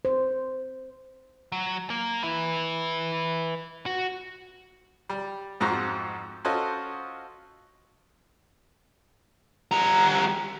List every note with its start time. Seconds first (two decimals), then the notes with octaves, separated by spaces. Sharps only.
0.05 C5
1.52 F#3
1.90 A#3
2.23 B4 E5
3.86 F#4
5.09 G3
5.60 F2 G#2 F3 F#4 A#5 C6
6.45 C#4 F4 F#4 A4 C5 D#5
9.72 G3 A#5